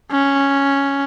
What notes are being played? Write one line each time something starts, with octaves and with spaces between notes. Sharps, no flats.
C#4